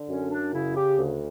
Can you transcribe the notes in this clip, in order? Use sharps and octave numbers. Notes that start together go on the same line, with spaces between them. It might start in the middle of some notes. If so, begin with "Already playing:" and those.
Already playing: D3
F#2 C#4
D4
C#3 E4
G4
D2